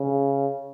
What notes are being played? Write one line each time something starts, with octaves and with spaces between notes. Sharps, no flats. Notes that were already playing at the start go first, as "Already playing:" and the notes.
Already playing: C#3